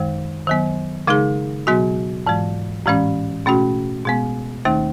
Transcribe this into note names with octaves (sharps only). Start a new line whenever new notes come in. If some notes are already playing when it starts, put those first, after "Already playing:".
Already playing: F#2 D#3 G#3
D#3 F#3 B3
C#3 G#3 D#4 G#4
B2 F#3 B3 F#4
G#2 E3 G#3
A2 E3 G#3 C#4
B2 A3 C#4 F#4
B2 G#3 B3
D#2 D#3 A3 D#4